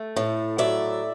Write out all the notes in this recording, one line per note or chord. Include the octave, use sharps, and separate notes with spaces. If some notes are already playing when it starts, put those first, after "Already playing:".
Already playing: A3
A2
F#3 D5 E5